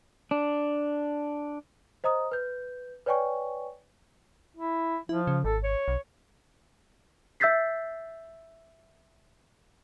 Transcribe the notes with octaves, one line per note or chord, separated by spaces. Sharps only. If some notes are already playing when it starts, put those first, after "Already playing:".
D4
C5 D#5 A#5 D#6
B4 G6
B4 C#5 D5 G5 G#5 C#6
E4
F3 E4
C#3
G#1 A4
C#5
B1
E5 E6 G6 A6 B6 C7